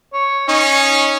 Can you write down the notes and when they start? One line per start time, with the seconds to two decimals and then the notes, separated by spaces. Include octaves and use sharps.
0.13 C#5
0.49 C#4 D#4